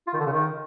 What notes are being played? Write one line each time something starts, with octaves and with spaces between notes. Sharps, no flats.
F4
D#3
D3
C#3
D#3